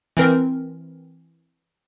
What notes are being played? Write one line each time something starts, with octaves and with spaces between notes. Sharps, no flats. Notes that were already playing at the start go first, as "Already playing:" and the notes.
E3 C4 A#4